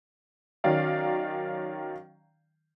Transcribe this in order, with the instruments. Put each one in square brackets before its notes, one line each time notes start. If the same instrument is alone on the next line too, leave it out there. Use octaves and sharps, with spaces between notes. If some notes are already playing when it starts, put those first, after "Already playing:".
[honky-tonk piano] D#3 F#3 C#4 D5 F5